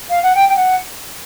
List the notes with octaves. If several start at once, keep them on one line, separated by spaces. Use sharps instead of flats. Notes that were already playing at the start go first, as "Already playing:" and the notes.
F5
F#5
G5
G5
F#5